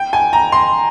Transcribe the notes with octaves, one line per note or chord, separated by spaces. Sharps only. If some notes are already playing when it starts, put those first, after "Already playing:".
Already playing: G5
G#5
A#5
C6